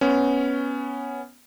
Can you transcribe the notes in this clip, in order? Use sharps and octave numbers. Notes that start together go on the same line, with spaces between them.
B3 C#4